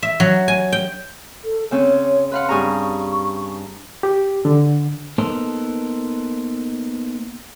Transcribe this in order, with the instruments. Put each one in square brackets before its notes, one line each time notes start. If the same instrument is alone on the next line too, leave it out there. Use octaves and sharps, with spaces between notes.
[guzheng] E5
F#3
G#5
G5
[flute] A4
[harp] C#3 C4 C#4 [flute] C#5
[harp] B4 F5 F#5 [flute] C6
[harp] G2 G#4 A#5 [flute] C#6
[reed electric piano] G4
D3
[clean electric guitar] A#3 B3 D#4 A4 A#4 C5